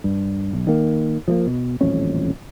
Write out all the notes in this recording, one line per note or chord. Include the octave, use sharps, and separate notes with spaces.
G2
B1
D#3 A#3
F3 A3 A#3
B2
D#1 A1 F2 C#4